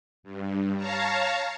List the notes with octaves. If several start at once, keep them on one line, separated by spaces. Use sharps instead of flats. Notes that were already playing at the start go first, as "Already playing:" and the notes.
G2
C#5 F5 A5 A#5